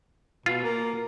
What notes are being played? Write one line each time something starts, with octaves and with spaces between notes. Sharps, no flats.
B2 F4
A#3